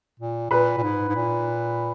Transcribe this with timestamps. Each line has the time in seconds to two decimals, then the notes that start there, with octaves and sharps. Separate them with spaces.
0.20 A#2
0.51 A#2 B4 B5
0.77 A#2
0.83 G#2
1.09 G#2
1.15 A#2